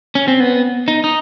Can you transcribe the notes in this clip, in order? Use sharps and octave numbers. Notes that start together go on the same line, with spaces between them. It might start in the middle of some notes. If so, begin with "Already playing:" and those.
C#4
C4
B3
D#4
D#4